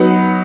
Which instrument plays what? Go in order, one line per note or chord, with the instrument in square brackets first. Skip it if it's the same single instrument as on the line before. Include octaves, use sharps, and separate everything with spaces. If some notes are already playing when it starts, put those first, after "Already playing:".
Already playing: [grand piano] F#3 B3 D#4 F#5